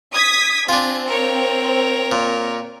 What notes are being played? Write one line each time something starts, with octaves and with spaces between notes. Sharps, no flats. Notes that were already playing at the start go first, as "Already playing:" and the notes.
D#6 G#6 B6
C4 D4 F4 G#5
A#4 C#5
A#2